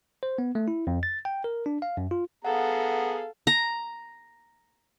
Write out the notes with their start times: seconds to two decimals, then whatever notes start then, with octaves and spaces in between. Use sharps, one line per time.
0.23 C5
0.38 B3
0.55 A3
0.68 E4
0.87 F2
1.03 A6
1.25 G5
1.44 A#4
1.66 D4
1.82 F5
1.97 F#2
2.11 F4
2.45 B3 G#4 A4 F5 F#5 A#5
3.47 A#5